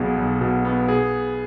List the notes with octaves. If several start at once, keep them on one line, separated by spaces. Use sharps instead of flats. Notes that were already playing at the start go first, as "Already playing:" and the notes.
Already playing: B1 B2 B3 G#4
B1
B2
B3
G#4